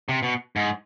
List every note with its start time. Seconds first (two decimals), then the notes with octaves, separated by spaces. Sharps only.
0.09 C3
0.23 B2
0.56 G#2